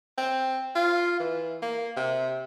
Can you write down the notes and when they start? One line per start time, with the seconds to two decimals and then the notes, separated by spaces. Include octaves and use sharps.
0.18 C4
0.75 F4
1.20 E3
1.62 A#3
1.97 C3